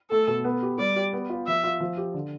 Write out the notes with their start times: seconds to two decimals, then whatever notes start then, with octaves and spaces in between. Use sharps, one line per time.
0.10 A3 A4
0.27 B2
0.44 B3
0.62 G4
0.78 G3 D5
0.96 G4
1.13 B3
1.29 F4
1.47 F3 E5
1.64 F4
1.80 F3
1.97 G4
2.14 D3